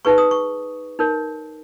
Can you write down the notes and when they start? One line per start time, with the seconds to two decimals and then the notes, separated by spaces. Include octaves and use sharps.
0.05 D#4 G#4 B4 C#6
0.18 D#6
0.31 C#6
0.99 D#4 A#4 C#5